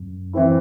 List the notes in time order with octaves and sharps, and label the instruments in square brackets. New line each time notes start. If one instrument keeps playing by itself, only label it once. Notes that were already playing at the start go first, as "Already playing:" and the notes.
Already playing: [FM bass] F#2
[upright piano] E3 C4 E4